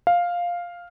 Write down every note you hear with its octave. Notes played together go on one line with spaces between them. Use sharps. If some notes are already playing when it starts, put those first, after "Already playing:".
F5